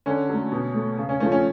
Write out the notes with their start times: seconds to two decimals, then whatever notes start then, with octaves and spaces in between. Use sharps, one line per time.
0.06 D3 C#4
0.29 F#3 A3
0.52 B2
0.74 A3
0.97 C#3
1.09 C#4
1.20 F3 A3 C#4
1.32 C#4